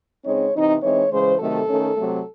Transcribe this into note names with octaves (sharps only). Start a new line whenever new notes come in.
C#3 G#3 C4 D#4 C#5
C3 E3 C4 D#4
E3 G#3 C4 D#4 C#5
C#3 E3 G#3 C5
C3 D#3 F#3 A3 A4
D#3 A3 C#4
C3 F#3 A3